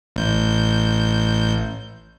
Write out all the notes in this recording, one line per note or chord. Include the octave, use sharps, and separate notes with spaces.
A1 G6